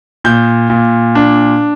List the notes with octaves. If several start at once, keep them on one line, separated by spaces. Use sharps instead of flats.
A#2 G6
A#2
D4